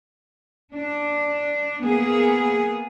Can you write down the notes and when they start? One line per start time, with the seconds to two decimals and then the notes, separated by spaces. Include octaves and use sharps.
0.74 D4
1.83 A#3 B3 G#4